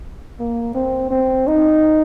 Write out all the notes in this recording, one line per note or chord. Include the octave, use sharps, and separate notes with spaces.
A#3
C4
C4
D#4